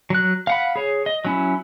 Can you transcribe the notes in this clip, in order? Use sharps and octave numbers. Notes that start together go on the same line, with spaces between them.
F#3 F#6
F5 F#5 B5
G#4 C#5
D#5
F#3 C#4 E4